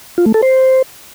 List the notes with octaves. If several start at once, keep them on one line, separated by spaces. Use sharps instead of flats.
F4
A3
A4
C5